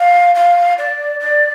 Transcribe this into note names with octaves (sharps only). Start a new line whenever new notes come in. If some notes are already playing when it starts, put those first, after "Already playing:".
Already playing: F5
F5
D5
D5